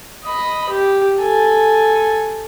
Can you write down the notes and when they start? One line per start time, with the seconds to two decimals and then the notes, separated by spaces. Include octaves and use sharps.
0.25 D#5 B5
0.69 G4
1.21 A4 G#5